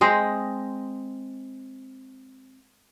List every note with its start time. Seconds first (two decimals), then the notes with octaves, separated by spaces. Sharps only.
0.01 G#3 C4 D#5